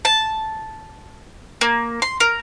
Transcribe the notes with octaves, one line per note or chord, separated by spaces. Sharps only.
A5
A#3
C6
A#4